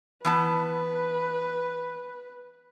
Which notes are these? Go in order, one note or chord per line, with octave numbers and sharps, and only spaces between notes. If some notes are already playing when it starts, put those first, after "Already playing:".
E3 B3 B4 A5